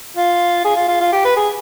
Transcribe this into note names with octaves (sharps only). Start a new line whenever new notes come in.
F4
G#4
F4
F4
F4
G4
B4
G#4